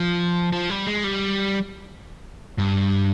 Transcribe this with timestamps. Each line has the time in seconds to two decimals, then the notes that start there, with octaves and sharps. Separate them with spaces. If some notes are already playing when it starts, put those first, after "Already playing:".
Already playing: F3
0.53 F3
0.70 G3
0.87 G#3
1.04 G3
2.59 G2